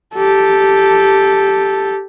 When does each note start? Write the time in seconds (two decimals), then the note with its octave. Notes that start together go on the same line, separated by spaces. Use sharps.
0.15 G4 A4